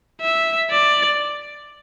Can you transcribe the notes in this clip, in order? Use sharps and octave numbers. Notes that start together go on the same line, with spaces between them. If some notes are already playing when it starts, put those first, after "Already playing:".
E5
D5